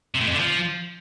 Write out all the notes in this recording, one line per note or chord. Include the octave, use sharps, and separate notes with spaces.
C3
A2
F2
D3
F3